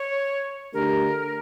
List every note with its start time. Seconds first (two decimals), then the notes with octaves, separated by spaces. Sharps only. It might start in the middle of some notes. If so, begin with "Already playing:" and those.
Already playing: C#5
0.73 D3 A3 D4 G4 A#4